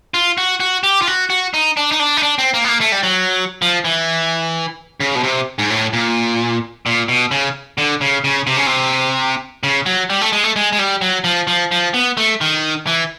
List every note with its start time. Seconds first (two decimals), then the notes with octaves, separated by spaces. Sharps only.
0.14 F4
0.38 F#4
0.60 F#4
0.83 G4
1.02 F4
1.07 F#4
1.30 F#4
1.54 D#4
1.77 D4
1.92 D#4
1.99 D4
2.17 D#4
2.23 D4
2.38 C4
2.54 A#3
2.64 B3
2.69 A#3
2.81 A3
2.92 G3
3.03 F#3
3.62 F3
3.85 E3
5.00 C#3
5.15 B2
5.23 C3
5.59 G#2
5.70 A2
5.93 A#2
6.86 A#2
7.09 B2
7.31 C#3
7.78 D3
8.01 C#3
8.24 C#3
8.47 C3
8.57 C#3
8.66 C3
9.63 C#3
9.86 F#3
10.10 G3
10.21 A3
10.33 G#3
10.44 A3
10.56 G#3
10.73 G#3
10.79 G3
11.01 F#3
11.24 F3
11.47 F3
11.72 F3
11.94 B3
12.17 A3
12.41 D#3
12.87 E3